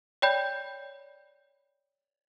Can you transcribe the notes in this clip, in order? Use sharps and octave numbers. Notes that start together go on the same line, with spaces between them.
C#5 D5 G5 B5 G6